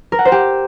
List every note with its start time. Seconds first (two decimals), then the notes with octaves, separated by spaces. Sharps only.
0.12 A#4
0.19 F#5
0.25 C5
0.32 G4